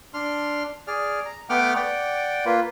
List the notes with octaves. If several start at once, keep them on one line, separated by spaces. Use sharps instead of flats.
D4 C6 F6
G#4 D5 F6
A#5
A3 B3 F#5 G5 D6 F6
D5 F#5 G5
A#3 F4 B4